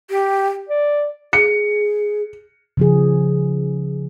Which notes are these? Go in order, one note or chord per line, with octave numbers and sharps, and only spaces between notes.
G4
D5
G#4 C#7
C#3 F3 G#4